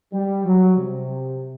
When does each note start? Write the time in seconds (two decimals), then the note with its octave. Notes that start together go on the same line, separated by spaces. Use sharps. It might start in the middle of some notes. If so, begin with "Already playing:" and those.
0.13 G3
0.45 F#3
0.76 C3